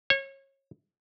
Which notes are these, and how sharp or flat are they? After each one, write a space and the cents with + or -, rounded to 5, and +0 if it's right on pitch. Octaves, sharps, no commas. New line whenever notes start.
C#5 -30